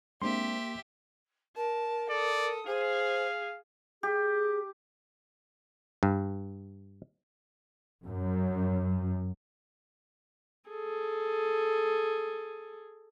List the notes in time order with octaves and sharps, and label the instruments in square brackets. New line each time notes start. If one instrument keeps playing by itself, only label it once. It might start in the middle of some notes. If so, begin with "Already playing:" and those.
[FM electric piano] G#3 C4 D4 [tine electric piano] A#3 C6 [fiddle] G4 E5
[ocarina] A#4 [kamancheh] A5
[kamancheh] A4 D#6 [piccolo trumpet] D5
[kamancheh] G#4 [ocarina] C5 [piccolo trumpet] F5
[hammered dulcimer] G4 [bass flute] G#4
[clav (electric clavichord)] G2
[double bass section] F#2
[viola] G#4 A4